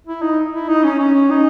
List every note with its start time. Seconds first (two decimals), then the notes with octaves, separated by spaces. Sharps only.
0.07 E4
0.22 D#4
0.54 E4
0.69 D#4
0.84 C#4
0.99 C#4
1.31 D#4